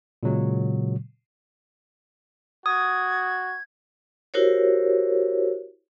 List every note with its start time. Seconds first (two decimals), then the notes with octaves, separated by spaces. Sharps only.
0.23 A#2 C#3 F#3 G#3
2.66 F#4 D#6 G#6
4.34 E4 F#4 G4 A#4 C5 C#5